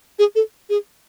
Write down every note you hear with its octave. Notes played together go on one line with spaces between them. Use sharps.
G#4
A4
G#4